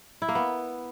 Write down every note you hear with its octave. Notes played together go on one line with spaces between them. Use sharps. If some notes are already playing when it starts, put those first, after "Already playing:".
E4
A#3
B3